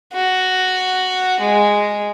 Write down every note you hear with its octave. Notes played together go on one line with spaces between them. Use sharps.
F#4
G#3